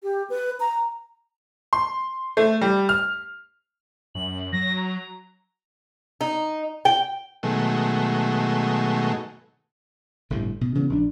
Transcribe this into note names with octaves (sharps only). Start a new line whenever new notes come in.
G4
B4
A#5
C6
A3
G3
F6
F#2 F#7
F#3 A#6
A#5
D#4
G5
B2 D#3 F#3 G#3 A3
G1 A2 C3
B2
C#3 E3 B3
A#1 D4